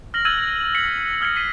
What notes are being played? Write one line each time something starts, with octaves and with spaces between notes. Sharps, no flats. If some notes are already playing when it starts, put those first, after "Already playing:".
F6 A#6 F#7
E6 F#6 G#6 A6 D#7 F#7
B6 C#7 F#7
D#6 F6 G#6 A#6 C#7
B6 C7 D#7